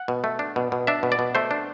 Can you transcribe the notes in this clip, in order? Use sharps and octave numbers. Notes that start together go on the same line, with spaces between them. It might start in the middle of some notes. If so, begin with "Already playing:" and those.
Already playing: F#5
B2
A3
D4
B2
B2
D4 E5
B2
D5
B2
A3 C5
D4